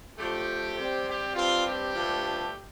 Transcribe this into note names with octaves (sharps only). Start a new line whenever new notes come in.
D3 F3 A3 G4
C3 G3 C4
G4
G2 G3 C4 F4
G4
G2 D3 F3 A3